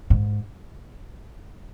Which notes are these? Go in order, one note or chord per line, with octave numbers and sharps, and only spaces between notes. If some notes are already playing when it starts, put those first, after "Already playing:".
G#2